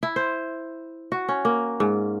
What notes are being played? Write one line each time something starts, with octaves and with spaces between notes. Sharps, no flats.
E4
C5
F#4
C#4
A#3
G#2